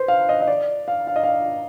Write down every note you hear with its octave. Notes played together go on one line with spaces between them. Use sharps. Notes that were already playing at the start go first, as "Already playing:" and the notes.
Already playing: B4 C5
F5
D#5
D#5
D5
F5
F5
D#5
F5